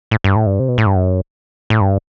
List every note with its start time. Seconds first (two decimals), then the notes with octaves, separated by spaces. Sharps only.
0.11 A2
0.24 G2
0.36 A2
0.46 G2
0.60 C3
0.68 B2
0.78 A2
0.86 G2
0.95 F#2
1.70 A2
1.81 G2